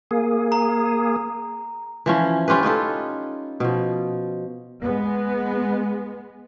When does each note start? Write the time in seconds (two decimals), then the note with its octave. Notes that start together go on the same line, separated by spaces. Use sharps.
0.11 A#3 G#4
0.52 A#5
2.06 E3 F3 C#4
2.48 C#4 F4 G4 B4
2.63 C#4 D#4 F4 A4
3.60 B2 F3
4.82 G#3 B3